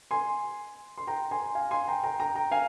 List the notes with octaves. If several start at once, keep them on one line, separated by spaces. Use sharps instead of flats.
G#5 C6
C6
G5 A#5
G#5 C6
F5 G#5
G#5 C6
G5 A#5
G5 A#5
G5 A#5
G5 A#5
F5 G#5